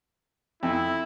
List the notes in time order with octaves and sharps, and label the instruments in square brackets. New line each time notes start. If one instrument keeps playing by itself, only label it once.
[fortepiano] F2 [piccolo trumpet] E4